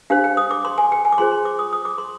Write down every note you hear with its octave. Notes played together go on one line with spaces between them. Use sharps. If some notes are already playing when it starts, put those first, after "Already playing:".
D4 G4 C5 F5
G5
D#6
D6
C6
G#5
G5
G#5
D6
F4 G#4 C5 C6
C6
D6
D#6
D#6
D6
C6